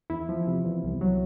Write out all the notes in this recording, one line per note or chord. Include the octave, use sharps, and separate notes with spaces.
E2 E4
F3
C3
E2
C2
F#3